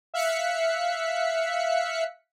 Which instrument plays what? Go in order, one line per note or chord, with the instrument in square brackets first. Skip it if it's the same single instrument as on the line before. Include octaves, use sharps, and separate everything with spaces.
[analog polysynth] E5 F5 F#6 B6 C#7